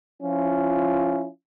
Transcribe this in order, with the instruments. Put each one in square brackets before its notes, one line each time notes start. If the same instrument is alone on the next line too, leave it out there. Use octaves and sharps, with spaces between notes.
[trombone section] F3 C#4 E4 F4